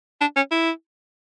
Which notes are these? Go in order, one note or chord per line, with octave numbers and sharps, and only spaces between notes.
D4
C#4
E4